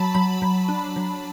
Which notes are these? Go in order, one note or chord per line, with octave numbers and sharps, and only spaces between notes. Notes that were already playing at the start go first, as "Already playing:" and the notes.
Already playing: F#3 A5 B5
F#3 B5
F#3
D4
F#3